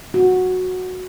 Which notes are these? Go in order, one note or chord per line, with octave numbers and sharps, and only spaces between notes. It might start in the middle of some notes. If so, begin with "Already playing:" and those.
F#4